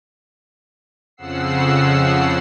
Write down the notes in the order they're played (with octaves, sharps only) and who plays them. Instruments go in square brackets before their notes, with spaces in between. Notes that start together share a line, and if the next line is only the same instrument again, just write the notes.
[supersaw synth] F2 C#3 F3 F#5 E6 C7